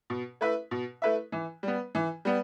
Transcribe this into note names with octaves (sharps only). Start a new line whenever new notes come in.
B2
A3 E4 B4 E5
B2
A3 E4 B4 E5
E3
G3 B3
E3
G3 B3